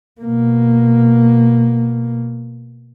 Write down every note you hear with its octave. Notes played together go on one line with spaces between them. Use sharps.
B2 A#3